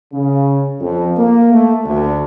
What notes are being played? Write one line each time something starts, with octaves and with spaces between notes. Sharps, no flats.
C#3
F2
A#3
A3
D2